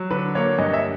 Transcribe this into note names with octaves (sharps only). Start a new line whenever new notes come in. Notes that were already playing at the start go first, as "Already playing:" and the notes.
Already playing: F#3
D3 B4
A#3 C#5
G2 D#5
E5